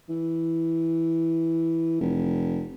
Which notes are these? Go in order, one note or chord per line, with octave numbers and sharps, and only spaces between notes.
E3
F1